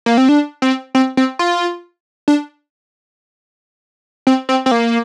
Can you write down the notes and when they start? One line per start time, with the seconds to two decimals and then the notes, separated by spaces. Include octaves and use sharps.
0.06 A#3
0.18 C4
0.29 D4
0.62 C4
0.95 C4
1.17 C4
1.39 F4
2.28 D4
4.27 C4
4.49 C4
4.66 C4
4.71 A#3